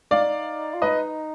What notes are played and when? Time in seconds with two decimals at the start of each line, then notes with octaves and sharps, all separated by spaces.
0.11 D#4 D5 F5
0.74 F4
0.82 D#4 B4 D#5